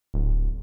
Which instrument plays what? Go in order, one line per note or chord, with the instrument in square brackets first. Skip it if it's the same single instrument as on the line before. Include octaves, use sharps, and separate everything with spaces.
[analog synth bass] D1